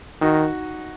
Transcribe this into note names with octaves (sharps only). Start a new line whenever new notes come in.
D#3 D#4 F#4